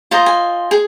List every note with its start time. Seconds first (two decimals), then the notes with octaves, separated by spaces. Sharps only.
0.11 F4 C5 D#5 A#5
0.26 G#5
0.71 G#4